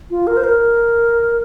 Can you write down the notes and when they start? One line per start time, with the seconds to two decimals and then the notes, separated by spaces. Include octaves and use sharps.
0.10 F4
0.27 A#4
0.37 C5
0.44 A#4